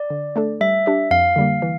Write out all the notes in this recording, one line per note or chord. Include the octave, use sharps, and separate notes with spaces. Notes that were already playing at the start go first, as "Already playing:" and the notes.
Already playing: D5
D3
A3 D4 A4
G3 E5
D4 G4 D5
F2 F5
D3 G3 A#3
E3